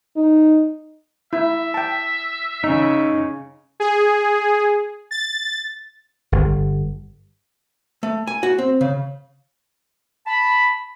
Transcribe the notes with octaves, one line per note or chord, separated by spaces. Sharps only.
D#4
E4 E5
G5 A5
C#3 D#4
G#4
A6
G1
A3
G#5
F#4
C4
C#3
A5 B5